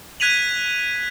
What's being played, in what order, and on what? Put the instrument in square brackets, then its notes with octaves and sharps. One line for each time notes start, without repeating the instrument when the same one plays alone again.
[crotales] F#6 G#6 B6 D#7 F7 F#7